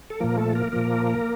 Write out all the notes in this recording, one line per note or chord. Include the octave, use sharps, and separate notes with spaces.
A4
A#2 F3 A#3 A#4
A3 A4
A#3 A#4
A#2 F3 A#3 A#4